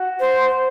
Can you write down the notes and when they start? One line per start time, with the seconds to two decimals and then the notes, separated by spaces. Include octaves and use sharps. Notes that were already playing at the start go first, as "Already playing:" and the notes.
Already playing: F#4
0.20 C5